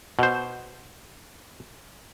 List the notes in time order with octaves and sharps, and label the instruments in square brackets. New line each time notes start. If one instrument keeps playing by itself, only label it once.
[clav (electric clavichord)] B2 C5